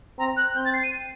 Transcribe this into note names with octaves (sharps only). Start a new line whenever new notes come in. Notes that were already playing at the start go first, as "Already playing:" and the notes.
C4 A#5
F#6
C4 G6
A6
C7
D#7